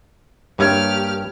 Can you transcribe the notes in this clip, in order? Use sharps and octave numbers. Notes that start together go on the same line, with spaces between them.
G2 A#3 G4 C#5 F6 G#6